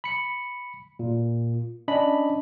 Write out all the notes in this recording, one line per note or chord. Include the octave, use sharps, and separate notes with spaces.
B5 C#7
A#2
C#4 D4 D#5 B5